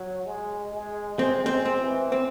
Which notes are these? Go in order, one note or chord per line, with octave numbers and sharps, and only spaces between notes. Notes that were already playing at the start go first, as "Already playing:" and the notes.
Already playing: F#3
G#3
G#3
G#3 C4
G#3 C4
C4
E3
C4